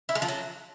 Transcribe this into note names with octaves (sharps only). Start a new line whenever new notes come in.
E4
G#3
F3
F#3